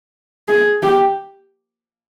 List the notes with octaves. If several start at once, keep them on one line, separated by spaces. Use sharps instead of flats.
G#4
G4